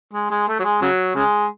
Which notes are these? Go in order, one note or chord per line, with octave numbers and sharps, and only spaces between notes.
G#3
G#3
A3
F#3
G#3
C#3 F#3
C#3 G#3